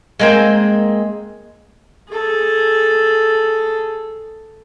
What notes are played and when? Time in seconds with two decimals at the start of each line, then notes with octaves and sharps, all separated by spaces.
0.20 G#3 A#3 C4
2.11 G#4 A4